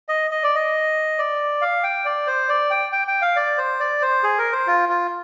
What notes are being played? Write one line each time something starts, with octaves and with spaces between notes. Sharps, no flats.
D#5
D#5
D5
D#5
D5
F5
G5
D5
C5
D5
G5
G5
G5
F5
D5
C5
D5
C5
G#4
A#4
C5
F4
F4